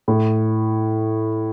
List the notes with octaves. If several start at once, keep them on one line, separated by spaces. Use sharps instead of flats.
A2